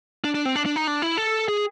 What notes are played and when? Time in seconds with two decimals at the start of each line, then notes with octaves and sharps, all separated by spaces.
0.24 D4
0.35 D4
0.45 C4
0.56 D4
0.66 D4
0.76 D#4
0.87 D4
1.02 E4
1.18 A4
1.48 G#4